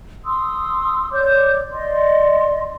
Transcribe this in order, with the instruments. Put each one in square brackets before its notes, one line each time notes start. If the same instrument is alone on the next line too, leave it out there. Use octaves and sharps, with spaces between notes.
[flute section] C6 D#6 E6
C#5 D5 D6 G6
D5 D#5 C6